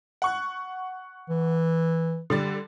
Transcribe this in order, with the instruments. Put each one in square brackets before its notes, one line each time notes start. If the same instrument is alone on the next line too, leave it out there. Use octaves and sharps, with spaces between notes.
[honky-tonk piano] F#5 C#6 F#6
[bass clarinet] E3
[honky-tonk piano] D3 G3 A6